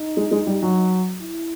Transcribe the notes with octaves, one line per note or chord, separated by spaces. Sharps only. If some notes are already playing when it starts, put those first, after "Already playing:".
Already playing: D#4
G#3
G#3
G3
F#3
E4